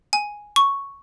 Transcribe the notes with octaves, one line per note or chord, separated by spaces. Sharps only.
G#5
C#6